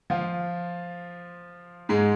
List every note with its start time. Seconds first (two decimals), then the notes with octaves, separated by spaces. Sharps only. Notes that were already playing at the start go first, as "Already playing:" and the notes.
0.10 F3 F4
1.89 G#2 G#3